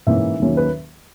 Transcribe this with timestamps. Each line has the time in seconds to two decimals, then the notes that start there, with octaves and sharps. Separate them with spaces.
0.07 G#2 E3 A#3 C#4 E5
0.40 D#2 D#3 F#3 A#3 C#4
0.57 B4